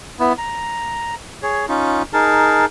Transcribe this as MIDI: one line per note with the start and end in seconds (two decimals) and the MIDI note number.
0.19 0.33 59
0.19 0.33 64
0.38 1.15 82
1.43 1.66 68
1.43 1.66 73
1.69 2.02 61
1.69 2.02 63
1.69 2.02 65
2.13 2.66 63
2.13 2.66 68
2.13 2.66 70
2.13 2.66 81